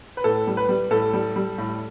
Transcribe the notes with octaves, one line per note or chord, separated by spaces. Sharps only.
B4
A2 A4
G3
B4
G3
A2 A4
G3
G3
A2